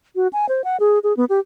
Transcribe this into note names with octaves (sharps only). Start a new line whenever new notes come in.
F#4
G#5
C5
F#5
G#4
G#4
B3
G4